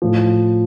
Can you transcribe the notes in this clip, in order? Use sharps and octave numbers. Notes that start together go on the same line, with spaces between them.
A2 F3